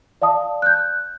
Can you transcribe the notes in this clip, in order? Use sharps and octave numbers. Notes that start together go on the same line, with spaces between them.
D5 F5 A5 D#6
F#6 G6